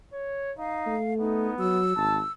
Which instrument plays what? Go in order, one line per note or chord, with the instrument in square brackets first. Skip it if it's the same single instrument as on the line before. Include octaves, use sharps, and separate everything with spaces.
[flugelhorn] C#5
[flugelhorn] D#4 [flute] F5
[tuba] A3
[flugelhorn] B3 [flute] D#4
[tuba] F#3 [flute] E6
[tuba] G#1 [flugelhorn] A5